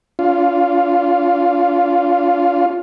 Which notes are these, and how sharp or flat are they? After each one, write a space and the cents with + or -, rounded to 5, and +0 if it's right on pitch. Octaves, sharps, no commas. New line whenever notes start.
D4 -45 F4 +0